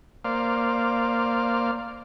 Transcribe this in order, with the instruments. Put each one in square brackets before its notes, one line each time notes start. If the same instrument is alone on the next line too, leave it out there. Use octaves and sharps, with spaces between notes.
[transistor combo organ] A#3 C5 D5 F5